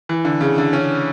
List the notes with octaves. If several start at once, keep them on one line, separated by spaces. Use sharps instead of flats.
E3
D3
C#3
D3
C#4